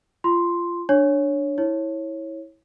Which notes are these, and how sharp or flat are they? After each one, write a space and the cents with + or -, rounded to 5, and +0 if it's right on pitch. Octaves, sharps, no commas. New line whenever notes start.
F4 -20 C6 +0
D4 +0 C#5 +0
E4 -20 C#5 -20